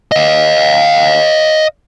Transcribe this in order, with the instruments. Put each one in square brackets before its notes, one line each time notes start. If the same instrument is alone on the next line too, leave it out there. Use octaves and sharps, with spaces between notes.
[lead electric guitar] D#5 F5